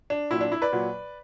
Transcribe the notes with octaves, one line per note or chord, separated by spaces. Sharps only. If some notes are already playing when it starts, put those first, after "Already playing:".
D4
A#2 F#3 E4
D4
E4
B4 D5
A#2 F#3